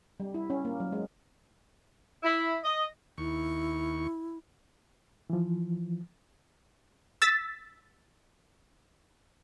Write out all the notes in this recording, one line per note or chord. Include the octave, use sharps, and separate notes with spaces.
G3
E4
C#4
A#3
F#3
G#3
E4
D#5
D#2 E4 C#6
E3 F3
E6 A6 B6